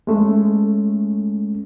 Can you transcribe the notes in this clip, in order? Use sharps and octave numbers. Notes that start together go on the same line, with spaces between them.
G#3 A3 C#4